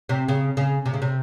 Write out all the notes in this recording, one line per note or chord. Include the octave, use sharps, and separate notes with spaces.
C3
C#3
C#3
C3
C#3
C3